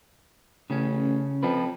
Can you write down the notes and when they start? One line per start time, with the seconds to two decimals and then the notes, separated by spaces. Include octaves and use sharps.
0.70 A1 C#3 C#4
1.43 F2 F3 B4